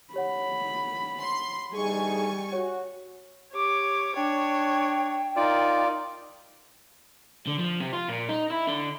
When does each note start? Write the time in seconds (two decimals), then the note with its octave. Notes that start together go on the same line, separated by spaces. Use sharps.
0.14 G4 C#5 F#5 B5
1.21 C6
1.74 D2 G3 D#4 G#4 G#5 C#6
2.53 F#4 C#5
3.53 G4 C#5 D6
4.14 D4 C#5 G5
5.36 D#4 F4 A#4 D5
7.48 D3
7.59 F3
7.80 C3
7.93 F4
8.09 A#2
8.29 D#4
8.50 E4
8.68 D3